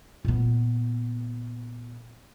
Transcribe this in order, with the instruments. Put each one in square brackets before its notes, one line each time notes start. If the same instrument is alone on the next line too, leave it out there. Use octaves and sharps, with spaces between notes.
[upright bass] A#2 B3